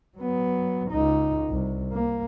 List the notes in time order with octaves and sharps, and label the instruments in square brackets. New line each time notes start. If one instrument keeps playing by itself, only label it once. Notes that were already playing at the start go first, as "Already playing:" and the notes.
[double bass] F#3 B3
C#2 D#4
C2
A#3